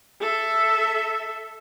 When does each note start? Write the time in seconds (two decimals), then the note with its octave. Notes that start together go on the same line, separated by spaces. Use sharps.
0.21 A4 E5